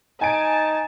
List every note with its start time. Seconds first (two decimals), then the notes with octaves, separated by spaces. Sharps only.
0.21 D#4 G#5 A5 D7